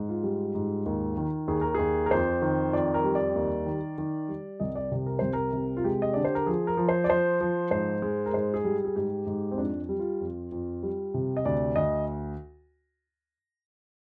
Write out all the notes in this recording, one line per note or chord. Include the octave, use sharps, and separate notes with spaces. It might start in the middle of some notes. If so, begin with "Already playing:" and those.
Already playing: G#2
F4
G3
G#2
D#2
D#3
D#2 G#4
A#4
D#2 G#4
A#4
F2 C5
D#3
F2 D5
A#4
G3
D5
D#2
D#3
D#3
G3
C2 D#5
D5
C3
A#4
C2 C5
A#4
C3
F4
G#3 G4
D#5
D3 D5
C5
A#4
F3 G#4
A#4
F3
C5
D5
F3 C5
F3
G#2 C5
G#3
A#4
G#2 C5
G#4
G3
G#4
G#2 G4
G#2
C4
F2 D4
G3
F4
F2
F2
G3
C3
D#5
D2 D5
D2 D#5